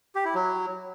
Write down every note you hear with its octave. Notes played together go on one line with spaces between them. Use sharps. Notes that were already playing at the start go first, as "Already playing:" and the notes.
G4
E4
F#3